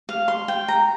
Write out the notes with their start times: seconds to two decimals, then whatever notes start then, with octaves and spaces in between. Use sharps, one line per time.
0.09 F5
0.28 C6
0.48 G5
0.68 A#5